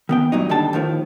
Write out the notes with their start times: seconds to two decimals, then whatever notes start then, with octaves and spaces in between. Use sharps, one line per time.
0.09 D#3 B3 G5
0.32 G2 A#2 F#3 D#4
0.49 D#2 D3 G3 G5 A5
0.73 D#2 A2 D#3 F3